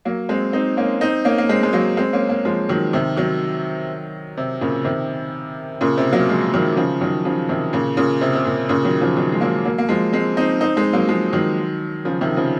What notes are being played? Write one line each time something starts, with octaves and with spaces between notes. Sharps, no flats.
F#3 A#3
G#3 C4
C4 D#4
A#3 C#4
C4 D#4
A#3 C#4
A#3
G#3 C4
G#3
F#3 A#3
G#3 C4
A#3 C#4
A#3 C#4
F3 G#3
D#3 F#3
C3 D#3
D#3 F#3
C3
A#2 C#3
C3 D#3
A#2 C#3
C3
F#3 A#3
F3 G#3
D#3 F#3
C#3 F3
D#3 F#3
C#3 F3
C3 D#3
A#2 C#3
A#2 C#3
C3
C3
A#2
A#2 C#3
D#3 F#3
C#3 F3
D#3 F#3
G#3
F#3 A#3
F#3 A#3
A#3
F3 G#3
G#3 C4
C4 D#4
C4 D#4
G#3 C4
F#3 A#3
F3 G#3
D#3 F#3
C#3 F3
C3 D#3
C#3 F3